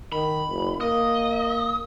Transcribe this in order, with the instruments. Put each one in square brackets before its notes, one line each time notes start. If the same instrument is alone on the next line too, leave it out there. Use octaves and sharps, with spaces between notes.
[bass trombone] D#3 [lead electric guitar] B5
[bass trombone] F#1
[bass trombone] A#3 [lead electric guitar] D#5